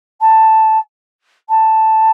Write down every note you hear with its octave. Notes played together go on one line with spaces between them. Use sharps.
A5
A5